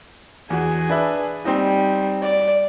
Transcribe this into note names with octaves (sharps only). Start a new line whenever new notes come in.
E2 F#4 G#4
D4 B4 E5
G3 C4 D#4
D5